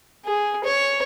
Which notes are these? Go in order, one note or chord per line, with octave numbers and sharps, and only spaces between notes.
G#4
C#5